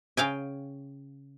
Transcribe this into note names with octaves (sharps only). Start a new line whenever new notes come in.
C#3 F5 G5 G#5